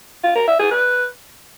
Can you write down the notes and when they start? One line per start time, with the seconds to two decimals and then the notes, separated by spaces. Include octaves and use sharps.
0.24 F4
0.36 A#4
0.47 E5
0.59 G#4
0.71 B4